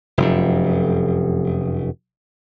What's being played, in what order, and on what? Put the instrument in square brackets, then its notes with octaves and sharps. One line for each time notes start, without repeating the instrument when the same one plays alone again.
[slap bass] F1 F#2